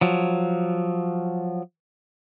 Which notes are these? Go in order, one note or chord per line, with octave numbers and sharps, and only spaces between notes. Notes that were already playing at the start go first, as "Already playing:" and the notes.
F3 F#3